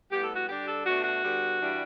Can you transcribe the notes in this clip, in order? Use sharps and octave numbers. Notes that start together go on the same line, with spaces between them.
A2 G3 B3 G4
A4
F#4
D3 G3 D4 G4
A4
B2 A3 D4 F#4
F#4
D3 G3 B3
G2 E3 G3 D4